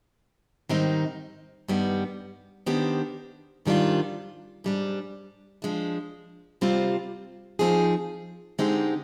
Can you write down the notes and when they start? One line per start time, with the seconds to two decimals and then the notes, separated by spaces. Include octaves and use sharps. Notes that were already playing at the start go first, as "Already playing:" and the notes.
0.69 G#2 D#3 G3 C4 D#4
1.68 G2 D#3 G3 B3
2.66 D#3 B3 D4 G4 C5
3.65 G#2 D#3 G3 D4 F4
4.64 G#2 G3 D4
5.62 F3 G#3 D4
6.61 C3 G3 C4 F4 C5
7.59 F3 C4 D#4 G#4
8.59 D3 G#3 C4 D#4 G4